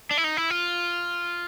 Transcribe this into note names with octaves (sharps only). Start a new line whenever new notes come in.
D4
E4
D#4
E4
F4